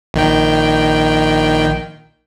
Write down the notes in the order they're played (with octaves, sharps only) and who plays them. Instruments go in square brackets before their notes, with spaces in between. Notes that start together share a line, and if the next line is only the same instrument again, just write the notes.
[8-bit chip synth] A#1 D#3 G5